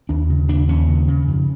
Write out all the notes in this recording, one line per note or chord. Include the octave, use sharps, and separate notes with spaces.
D#2 D4
C#3
D#2 D4
D#2 C#4
C#3
C#3
F2